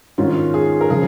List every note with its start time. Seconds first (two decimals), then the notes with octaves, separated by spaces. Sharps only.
0.18 G#2 D#3 C#4 F4
0.54 G#4
0.81 A#4
0.90 C#3 F3 G#4